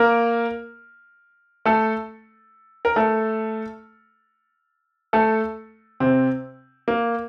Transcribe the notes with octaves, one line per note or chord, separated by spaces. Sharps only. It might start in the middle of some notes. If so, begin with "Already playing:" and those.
Already playing: A#3 A#4
A3 A4
A#4
A3 A4
A3 A4
C3 C4
A#3